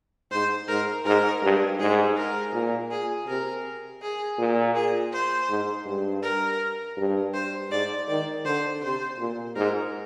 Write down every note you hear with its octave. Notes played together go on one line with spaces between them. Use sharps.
G#2 C5
G#2 A#4
G#2 A#4
G2
G#2 G#4
A#4
A#2
G#4
C3 A#4
G#4
A#2
G#4
C5
G#2
G2
A#4
G2
C5
G#2 D5
D#3 D5
D3 C5
C3 C5
A#2
G#2 A#4